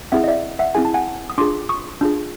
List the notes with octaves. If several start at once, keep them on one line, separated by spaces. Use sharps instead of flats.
C4 E4 G#4 E5 F#5
D#5
D5 E5
E5 F#5
C4 E4 G#4 G#5
A5
F#5 G#5
D#6
D4 F4 G#4 C6 D6
C#6 D#6
D4 F4 G#4